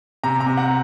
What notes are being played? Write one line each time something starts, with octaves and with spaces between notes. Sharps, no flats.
C3 A#5
A#5
C3
F#5